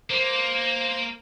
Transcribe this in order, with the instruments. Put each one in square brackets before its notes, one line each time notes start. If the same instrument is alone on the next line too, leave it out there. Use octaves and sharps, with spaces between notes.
[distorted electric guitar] A#3 [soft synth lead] C5